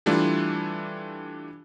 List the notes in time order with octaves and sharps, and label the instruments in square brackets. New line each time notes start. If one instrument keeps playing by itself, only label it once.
[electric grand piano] E3 G3 A3 D4 E4 F4